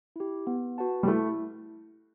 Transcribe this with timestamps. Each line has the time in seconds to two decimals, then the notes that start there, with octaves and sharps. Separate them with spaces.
0.16 E4 G4
0.47 B3
0.78 F#4 B4 F#5 A5
1.03 G3
1.08 A3 E4